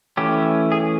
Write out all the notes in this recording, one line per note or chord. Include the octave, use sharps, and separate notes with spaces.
E3 A3 C#4 G4
G#4